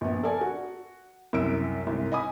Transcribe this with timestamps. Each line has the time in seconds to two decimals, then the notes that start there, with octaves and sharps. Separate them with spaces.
0.01 A#1 B3
0.23 A4 A#4 D5 G#5
0.41 F#4
1.33 C2 F#2 E6 D7
1.87 C2 G#2
2.12 D#5 G#5 B5 D#6